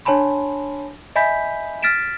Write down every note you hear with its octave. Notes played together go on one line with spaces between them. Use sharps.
D4 C#5 G#5 A5 B5 C6
D#5 E5 G#5 B5 G6 B6
F6 A6 B6 D7 E7